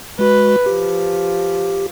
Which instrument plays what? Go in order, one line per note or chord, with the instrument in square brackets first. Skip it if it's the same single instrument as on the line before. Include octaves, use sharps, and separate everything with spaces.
[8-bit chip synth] G#3 F#4 [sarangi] B4
[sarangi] F3 [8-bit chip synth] G4